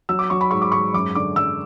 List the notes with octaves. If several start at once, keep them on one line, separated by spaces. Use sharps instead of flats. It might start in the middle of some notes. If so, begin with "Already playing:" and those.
F#3 E6
D6
F#3 C#6
B5
G#2 C#6
D6
G#2 C#6
F#2 D6
D3 D6
F#2 E6